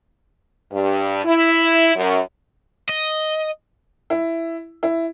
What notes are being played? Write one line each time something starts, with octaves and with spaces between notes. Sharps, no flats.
G2
E4
F#2
D#5
E4
E4